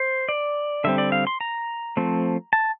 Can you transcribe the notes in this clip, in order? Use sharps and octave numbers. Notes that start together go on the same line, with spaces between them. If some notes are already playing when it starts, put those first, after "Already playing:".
Already playing: C5
D5
D3 G3 C4 E5
D5
F5
C6
A#5
F3 A3 C4
A5